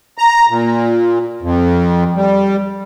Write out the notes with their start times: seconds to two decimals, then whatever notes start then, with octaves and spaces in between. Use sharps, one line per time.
0.18 A#5
0.50 A#2
1.42 F2
2.16 G3